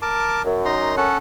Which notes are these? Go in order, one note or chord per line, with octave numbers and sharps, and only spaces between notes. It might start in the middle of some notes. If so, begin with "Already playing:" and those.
A#4 A5 D6
F#2
D#4 A#5 C6
C#4 A4 F#5